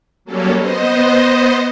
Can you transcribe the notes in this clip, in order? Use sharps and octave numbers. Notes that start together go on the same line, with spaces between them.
F#3 G3 A#3 C#4 A4
B3 C5 D#5